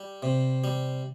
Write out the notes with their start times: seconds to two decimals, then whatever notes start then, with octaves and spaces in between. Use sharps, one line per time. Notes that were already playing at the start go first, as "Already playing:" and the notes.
Already playing: G3
0.23 C3
0.64 G3